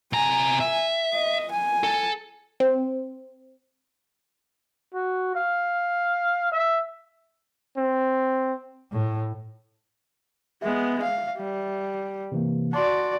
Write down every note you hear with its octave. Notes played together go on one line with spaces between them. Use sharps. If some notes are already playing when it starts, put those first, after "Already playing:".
C3 G#5 A#5
E5
D#5
G#5
A4
C4
F#4
F5
E5
C4
A2
G#3 B3 E5
F5
G3
C3 E3 A#3
F#4 D5 A5 C6